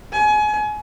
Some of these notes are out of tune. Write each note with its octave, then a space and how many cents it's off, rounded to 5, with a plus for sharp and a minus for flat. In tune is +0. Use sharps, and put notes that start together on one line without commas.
G#5 +30